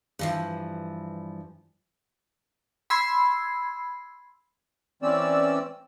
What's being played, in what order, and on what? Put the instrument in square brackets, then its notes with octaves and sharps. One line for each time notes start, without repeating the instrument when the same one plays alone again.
[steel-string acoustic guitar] G2 E3 F3
[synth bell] B5 C6 E6 G#6 C7
[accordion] E3 C4 C#4 D5 E6